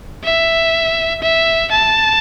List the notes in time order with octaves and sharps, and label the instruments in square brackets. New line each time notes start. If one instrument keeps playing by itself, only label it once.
[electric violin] E5
E5
A5